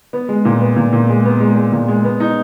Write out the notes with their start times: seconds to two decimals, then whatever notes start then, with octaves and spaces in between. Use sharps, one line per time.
0.13 B3
0.29 G#3
0.45 A#2
0.61 B3
0.76 A#2
0.93 A#2
1.09 G#3
1.25 B3
1.40 G#3
1.56 G#3
1.72 A#2
1.88 G#3
2.04 B3
2.20 D#4